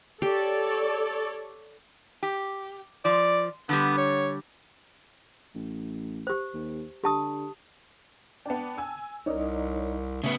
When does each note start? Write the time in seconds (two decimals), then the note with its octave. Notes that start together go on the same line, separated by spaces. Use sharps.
0.22 G4 A4 C#5 D5
2.23 G4
3.05 F3 D5
3.69 D3 G3 B3
3.97 C#5
5.55 A1
6.27 G4 C5
6.54 D#2
7.04 D3 G4 A5 D#6
8.46 B3 D4 G5 A5
8.78 G#5 E6
9.26 C2 C#4 D#4 A#4 D5 D#5
10.24 C#3 A3 B3